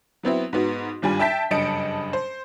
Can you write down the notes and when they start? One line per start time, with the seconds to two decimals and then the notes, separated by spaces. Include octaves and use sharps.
0.23 F#3 B3 C4 E4
0.53 G#2 B3 F#4
1.02 G#1 G2 G3 F4 G#5
1.19 E5 G5 A5 G6 B6
1.51 F#1 G2 D#5 A5 C#7 D7
2.13 C5